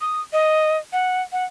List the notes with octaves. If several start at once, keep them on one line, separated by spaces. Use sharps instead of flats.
D#6
D#5
F#5
F#5